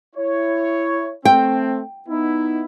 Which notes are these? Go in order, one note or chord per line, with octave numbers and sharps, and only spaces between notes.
E4 C#5
A3 C4 G5
B3 D#4 E4